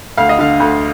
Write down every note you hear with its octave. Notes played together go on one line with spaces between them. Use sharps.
D2 F5
D#5
D3 F5
D2